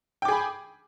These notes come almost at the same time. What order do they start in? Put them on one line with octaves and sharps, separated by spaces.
G5 D6 G#4 B5